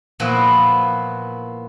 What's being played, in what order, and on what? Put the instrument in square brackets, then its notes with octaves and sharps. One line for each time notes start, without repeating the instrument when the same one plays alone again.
[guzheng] A#2 F3 B3 E4 F#4